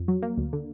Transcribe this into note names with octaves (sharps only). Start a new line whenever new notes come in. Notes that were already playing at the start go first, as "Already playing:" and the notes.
Already playing: F2
F#3
A#3
D2
D3